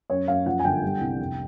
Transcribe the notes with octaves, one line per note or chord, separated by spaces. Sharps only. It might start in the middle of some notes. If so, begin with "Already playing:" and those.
F#2 C#5
F#2 F5
F3 F#5
G#5
G1 G5
G3
C2
F1